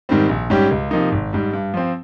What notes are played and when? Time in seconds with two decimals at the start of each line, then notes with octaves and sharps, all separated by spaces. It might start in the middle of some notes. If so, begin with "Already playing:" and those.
0.09 G#2 D#3 G3 C4
0.29 A#1
0.50 G#2 G3 C#4 G4
0.71 C#2
0.91 C3 F3 A#3 D#4
1.12 G#1
1.33 G#2 G3
1.53 G2
1.74 F3 C4